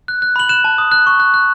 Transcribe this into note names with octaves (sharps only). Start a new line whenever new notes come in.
F#6
F#6
B5 F#7
F#6 E7
A5
D#6
F#6
C#6
F#6
F#6